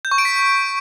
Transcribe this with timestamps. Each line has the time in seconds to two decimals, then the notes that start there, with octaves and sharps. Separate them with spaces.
0.05 G6
0.11 C#6
0.18 D7
0.25 B6